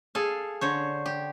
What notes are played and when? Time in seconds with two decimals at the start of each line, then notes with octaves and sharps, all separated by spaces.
0.15 G#4 A4 F5
0.61 D3 C5 C#5
1.06 G4